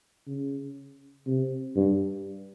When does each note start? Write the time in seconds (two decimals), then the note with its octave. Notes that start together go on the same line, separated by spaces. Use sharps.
0.27 C#3
1.27 C3
1.76 G2